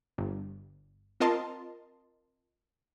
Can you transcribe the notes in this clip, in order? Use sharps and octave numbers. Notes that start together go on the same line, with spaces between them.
G1
C4 F4 A#4 D#5 A5 C6